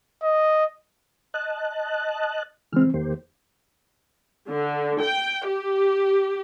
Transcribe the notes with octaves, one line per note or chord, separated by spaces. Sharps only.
D#5
D#5 A5 F#6
C#3 E3 G#3 C4 F6
E2 D#3 A#3 G4 C5
D3
G5
G4